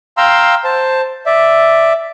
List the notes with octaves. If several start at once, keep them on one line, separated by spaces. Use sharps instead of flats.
F5 G5 A#5 C6 E6
C5 A5
D5 E5